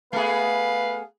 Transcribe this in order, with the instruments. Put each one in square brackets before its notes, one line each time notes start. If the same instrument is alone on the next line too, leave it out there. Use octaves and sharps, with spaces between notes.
[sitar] A3 B3 G#4 [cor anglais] B4 [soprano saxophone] F5